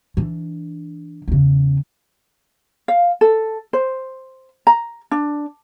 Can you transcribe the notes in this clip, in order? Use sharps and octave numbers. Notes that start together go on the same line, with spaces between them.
E3 D4
E2 C#3
F5
A4
C5
A#5
D4